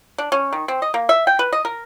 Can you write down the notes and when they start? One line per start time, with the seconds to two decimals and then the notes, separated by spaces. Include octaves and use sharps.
0.18 D4
0.32 C#4
0.53 D#3
0.68 C4
0.82 D#5
0.94 A#3
1.09 E5
1.27 G5
1.39 B4
1.53 D#5
1.65 A#4